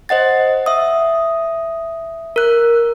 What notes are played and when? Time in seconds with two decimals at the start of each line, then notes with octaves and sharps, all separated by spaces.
0.09 C5 D#5 F#5 A6
0.66 E5 D#6
2.36 A#4 F#6